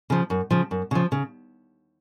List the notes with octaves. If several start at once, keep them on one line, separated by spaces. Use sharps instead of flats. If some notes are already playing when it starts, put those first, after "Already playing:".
C#3 F3
F#2
C#3 F3
F#2
C#3 F3
C#3